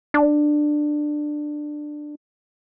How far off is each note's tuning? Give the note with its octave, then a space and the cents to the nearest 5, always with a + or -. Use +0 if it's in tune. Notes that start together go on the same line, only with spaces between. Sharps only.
D4 +15